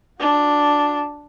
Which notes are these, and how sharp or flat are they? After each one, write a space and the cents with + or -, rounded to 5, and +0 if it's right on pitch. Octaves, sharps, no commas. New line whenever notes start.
D4 +0 F#4 -35